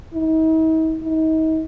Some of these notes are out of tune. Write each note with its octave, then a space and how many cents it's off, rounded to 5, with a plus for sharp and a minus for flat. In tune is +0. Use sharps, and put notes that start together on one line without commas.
D#4 +45
D#4 +35